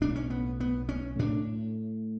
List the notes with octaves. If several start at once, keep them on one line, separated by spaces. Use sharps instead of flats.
B1 A2 D4
C#4
B3
B3
C#4
A2 D4